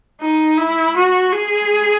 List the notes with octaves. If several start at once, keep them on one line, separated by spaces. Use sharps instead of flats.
D#4
E4
F#4
G#4